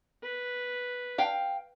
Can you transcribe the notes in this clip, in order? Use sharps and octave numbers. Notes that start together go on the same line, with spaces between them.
B4
F5 G5